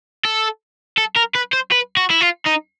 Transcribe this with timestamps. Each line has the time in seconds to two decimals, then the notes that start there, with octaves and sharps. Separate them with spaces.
0.25 A4
0.98 A4
1.17 A#4
1.35 B4
1.53 C5
1.72 B4
1.97 F#4
2.10 E4
2.21 F4
2.46 D#4